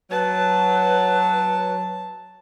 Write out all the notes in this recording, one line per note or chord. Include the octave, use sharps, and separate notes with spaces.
F#3 B4 A5